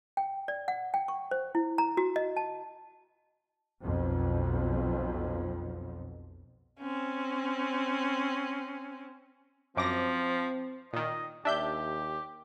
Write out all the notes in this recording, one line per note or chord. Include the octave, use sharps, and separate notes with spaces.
G5
D5
F#5
G5
C#6
C5
E4
A#5
F#4
D#5
A5
B1 F2
C4 C#4
F#2 F3 C4 D6 A#6
A#2 D#3 D#5
D#2 D4 G4 E5 G6